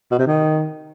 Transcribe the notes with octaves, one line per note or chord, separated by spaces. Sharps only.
B2
C3
D#3